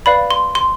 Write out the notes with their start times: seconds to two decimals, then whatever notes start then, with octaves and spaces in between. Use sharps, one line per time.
0.06 B4 D5 F5 B5
0.31 C6
0.55 C6